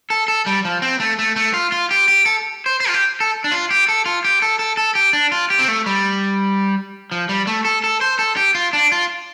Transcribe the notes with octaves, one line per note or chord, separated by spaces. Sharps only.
A4
A4
G3
F3
C4
A3
A3
A3
F4
F4
G4
G4
A4
C5
C5
F4
G4
A4
D4
F4
G4
A4
F4
G4
A4
A4
A4
G4
D4
F4
G4
C4
A3
G3
F3
G3
A3
A4
A4
C5
A4
G4
F4
D4
F4